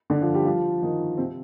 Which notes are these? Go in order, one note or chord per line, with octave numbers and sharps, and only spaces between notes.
D3 D4
F3 F4
G3 G4
F3 F4
D#3 D#4
C3 C4